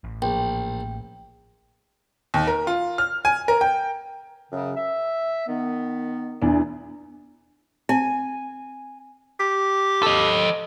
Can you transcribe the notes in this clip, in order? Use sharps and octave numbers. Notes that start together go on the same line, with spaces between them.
A1
A#1 G5
D#2
A#4
F4
F6
G#5
A#4
G5
F#2 C#3
E5
D#3 B3
E2 D4
C4 G#5
G4
A4 D#5